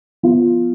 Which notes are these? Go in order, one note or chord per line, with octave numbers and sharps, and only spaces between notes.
F3 B3 F4